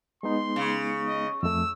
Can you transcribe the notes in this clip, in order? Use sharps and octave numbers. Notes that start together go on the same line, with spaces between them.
G#3 B3 D#4 C6
C#3
D#5
F2 A3 E6